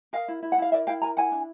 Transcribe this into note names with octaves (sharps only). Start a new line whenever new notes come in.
A#4 D#5 F5
E4
E4
F#5
E4 F5
A#4 D5 E5
E4 F5 G5
A#4 G#5 A#5
E4 F#5 G#5
D4